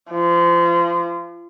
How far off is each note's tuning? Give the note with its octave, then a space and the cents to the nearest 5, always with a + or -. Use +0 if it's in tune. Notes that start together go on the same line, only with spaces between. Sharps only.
F3 -30